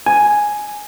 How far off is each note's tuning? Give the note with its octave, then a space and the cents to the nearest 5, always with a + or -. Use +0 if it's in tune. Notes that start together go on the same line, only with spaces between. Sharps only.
G#5 +5